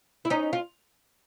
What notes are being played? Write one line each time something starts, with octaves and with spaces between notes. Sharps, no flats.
E4
C#4 D#4
F4